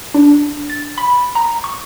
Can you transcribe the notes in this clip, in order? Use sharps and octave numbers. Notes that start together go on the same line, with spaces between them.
D4
A6
B5
A#5
C#6